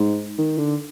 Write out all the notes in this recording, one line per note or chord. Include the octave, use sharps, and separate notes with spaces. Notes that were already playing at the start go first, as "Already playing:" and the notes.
Already playing: G#2
D#3
D3